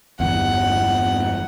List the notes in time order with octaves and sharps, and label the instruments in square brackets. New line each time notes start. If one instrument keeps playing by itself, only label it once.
[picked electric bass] G1 E2 [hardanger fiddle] F#5